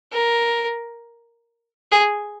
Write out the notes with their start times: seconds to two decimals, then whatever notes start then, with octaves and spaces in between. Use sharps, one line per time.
0.12 A#4
1.92 G#4